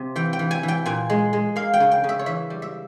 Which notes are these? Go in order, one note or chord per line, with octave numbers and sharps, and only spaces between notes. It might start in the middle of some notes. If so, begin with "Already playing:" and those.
Already playing: C3 C4
E3 G5
G5
E3
G#5
E3
G5
A#2 G#5
G#3
G#3
A#3 F5
G5
C#3
G5
C#3
E5
C#5
E3 E5
G3
E5